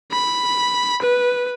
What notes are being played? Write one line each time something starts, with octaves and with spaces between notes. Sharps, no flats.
B5
B4